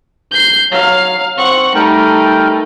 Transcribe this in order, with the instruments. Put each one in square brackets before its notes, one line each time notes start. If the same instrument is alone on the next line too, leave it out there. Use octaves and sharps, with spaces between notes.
[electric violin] G6 C7
[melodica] F#3 [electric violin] F5
[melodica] C4 [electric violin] F#5 C#6
[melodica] G3 A#4 G5 [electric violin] A3 D#4